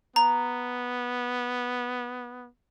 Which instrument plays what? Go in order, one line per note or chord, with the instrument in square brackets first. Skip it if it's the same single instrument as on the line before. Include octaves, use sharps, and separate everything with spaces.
[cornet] B3 [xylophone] A#5